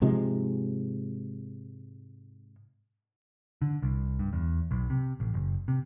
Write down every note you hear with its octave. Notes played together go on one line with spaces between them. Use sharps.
G#2 C3 F3 G#3
D3
C2
G2
E2
B1
C3
A1
F#1
C3